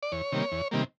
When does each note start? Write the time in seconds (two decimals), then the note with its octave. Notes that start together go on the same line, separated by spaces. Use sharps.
0.03 D5
0.12 E2 C#5
0.32 C3 D#3 G3 A#3
0.52 E2
0.71 C3 D#3 G3 A#3